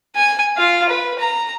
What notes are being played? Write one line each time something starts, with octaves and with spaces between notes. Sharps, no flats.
G#5
F4 F5
B4
A#5